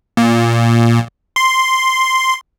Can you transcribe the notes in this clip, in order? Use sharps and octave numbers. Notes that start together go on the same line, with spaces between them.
A#2
C6